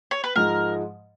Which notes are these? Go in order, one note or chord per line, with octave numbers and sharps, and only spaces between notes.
C#5
B4
G#2 F3 G#3 A#4